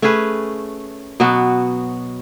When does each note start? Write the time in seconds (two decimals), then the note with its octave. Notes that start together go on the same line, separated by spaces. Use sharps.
0.02 A3 C#4 G#4 B4
1.20 B2 F#3 B3 F#4